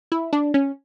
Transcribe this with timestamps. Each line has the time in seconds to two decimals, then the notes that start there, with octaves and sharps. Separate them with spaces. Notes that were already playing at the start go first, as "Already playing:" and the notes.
0.12 E4
0.33 D4
0.54 C#4